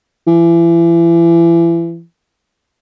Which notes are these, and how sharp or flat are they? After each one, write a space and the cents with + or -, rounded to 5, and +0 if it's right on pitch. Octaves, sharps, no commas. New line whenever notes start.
E3 +35